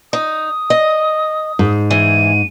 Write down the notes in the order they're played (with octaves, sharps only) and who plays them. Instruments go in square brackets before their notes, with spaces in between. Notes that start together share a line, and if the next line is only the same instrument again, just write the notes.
[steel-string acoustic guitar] D#4 [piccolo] D#6
[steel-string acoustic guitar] D#5
[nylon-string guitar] G#2
[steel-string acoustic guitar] E3 G#4 [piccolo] D#7